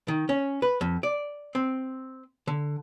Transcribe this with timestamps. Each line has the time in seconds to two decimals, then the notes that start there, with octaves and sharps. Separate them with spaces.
0.08 D#3
0.29 C#4
0.62 B4
0.81 F2
1.03 D5
1.55 C4
2.47 D3